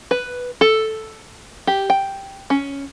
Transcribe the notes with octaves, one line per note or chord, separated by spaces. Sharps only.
B4
A4
G4
G5
C#4